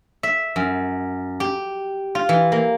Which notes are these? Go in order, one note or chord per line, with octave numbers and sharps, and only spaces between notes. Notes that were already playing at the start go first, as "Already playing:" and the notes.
E5
F#2
G4
F4
E3
A#3